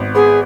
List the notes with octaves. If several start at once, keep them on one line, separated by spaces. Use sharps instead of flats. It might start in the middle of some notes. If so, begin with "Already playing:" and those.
Already playing: G#1 B3
B3 G#4